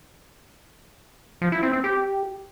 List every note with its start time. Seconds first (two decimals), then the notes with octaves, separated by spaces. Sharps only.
1.42 F3
1.52 E4
1.63 C4
1.73 C4
1.84 G4